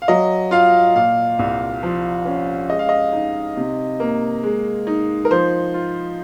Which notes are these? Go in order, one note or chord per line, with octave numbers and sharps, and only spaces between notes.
F5
F#3 D#5
F4 F5
A#2 F5
C2
F3
C#4
G#3 D#5
F5
D#5
D#4
C3
A#3
G#3
D#4
A#4
F3 C5
F4